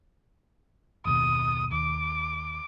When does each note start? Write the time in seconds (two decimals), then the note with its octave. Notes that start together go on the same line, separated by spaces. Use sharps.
1.05 F#1 D#2 B2 D#6
1.72 D#2 D6